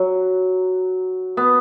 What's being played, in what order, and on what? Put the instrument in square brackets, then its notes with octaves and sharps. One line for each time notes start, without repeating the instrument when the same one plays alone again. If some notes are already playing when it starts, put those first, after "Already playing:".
Already playing: [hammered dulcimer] F#3
B3